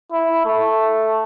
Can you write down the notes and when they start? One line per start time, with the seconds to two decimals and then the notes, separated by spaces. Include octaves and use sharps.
0.12 E4
0.46 A3